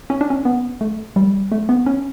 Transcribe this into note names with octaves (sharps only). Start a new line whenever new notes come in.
C#4
D4
C#4
B3
A3
G3
A3
B3
C#4